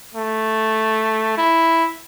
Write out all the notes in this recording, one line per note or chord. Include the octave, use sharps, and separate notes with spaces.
A3
E4